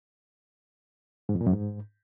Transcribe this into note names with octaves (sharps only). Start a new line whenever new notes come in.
G#2
F2
A#2
F#2
G#2